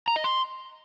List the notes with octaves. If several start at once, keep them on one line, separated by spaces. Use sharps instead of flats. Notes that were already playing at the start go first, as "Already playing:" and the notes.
A#5
D#5
C6